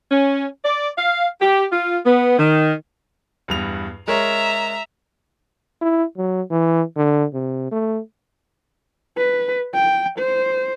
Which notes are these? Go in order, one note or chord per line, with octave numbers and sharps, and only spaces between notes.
C#4
D5
F5
G4
F4
B3
D#3
E2 G2 F7
G#3 A#4 C#5 E5 A#5
E4
F#3
E3
D3
C3
A3
B4
G5
C5